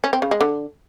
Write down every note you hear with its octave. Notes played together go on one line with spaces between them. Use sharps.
C#4
C4
C#3
G#3
D3